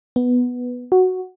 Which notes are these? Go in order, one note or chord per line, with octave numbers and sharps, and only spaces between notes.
B3
F#4